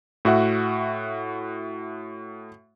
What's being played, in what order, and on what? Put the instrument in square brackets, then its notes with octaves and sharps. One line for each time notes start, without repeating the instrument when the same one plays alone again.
[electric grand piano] A2 F#4 E5 F#5